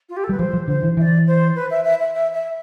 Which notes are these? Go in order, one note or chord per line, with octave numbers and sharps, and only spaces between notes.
F4
G4
A4
G3 B4
F3 C5
F3
D3 C5
E3
E3 D5 E5
C5
B4
E5
E5
E5
E5
E5